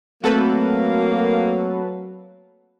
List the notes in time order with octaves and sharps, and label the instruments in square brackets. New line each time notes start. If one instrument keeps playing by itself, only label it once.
[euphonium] F#3 [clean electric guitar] A3 C4 A5 [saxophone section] A#3 [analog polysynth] F#4 A4 B4